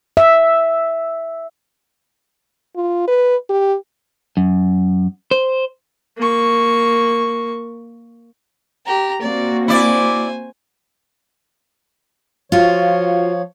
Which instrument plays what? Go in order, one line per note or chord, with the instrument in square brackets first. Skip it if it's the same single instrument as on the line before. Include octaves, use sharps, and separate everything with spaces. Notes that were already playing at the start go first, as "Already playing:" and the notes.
[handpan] E5
[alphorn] F4
B4
G4
[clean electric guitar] F#2
C5
[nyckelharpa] A#3 C#6
[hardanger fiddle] G4 A#5
[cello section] A#3 C4 F#4 [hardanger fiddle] D5
[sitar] E4 D5 [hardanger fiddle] C5 G#5
[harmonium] F3 C#5 [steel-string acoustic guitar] F4 F#4